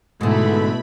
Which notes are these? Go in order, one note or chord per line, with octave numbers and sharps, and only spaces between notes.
G#2 B2 D3 A3 E4 B5